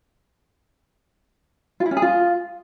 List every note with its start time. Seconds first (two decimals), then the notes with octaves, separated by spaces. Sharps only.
1.80 F4
1.86 E4
1.91 C#4
1.97 G#4
2.02 F4